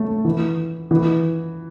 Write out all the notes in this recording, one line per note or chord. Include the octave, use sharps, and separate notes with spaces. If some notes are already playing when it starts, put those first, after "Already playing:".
Already playing: A3
E3
E3